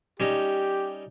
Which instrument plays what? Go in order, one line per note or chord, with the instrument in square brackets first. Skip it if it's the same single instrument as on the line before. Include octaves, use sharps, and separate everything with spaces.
[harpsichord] G3 C#4 D#4 [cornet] G4